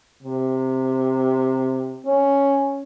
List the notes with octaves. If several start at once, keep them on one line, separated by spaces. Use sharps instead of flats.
C3
C#4